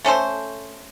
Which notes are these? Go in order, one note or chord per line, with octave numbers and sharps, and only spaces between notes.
A3 C#4 A4 C5